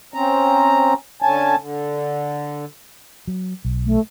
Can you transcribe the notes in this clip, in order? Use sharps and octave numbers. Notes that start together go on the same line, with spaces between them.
C4 C#4 A#5
D3 C#4 G#5 A5
D3
F#3
B1
A3